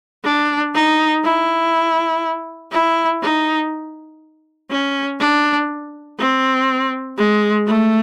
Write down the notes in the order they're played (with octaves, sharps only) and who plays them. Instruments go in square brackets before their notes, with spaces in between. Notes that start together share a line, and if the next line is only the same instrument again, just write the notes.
[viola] D4
D#4
E4
E4
D#4
C#4
D4
C4
G#3
A3